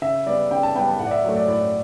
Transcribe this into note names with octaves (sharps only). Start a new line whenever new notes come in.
C#3 E5
G3 B3 D5
C#3 G5
A5
G3 B3 G5
A5
A2 F#5
D5
E5
F#3 A3
D5
A2 D5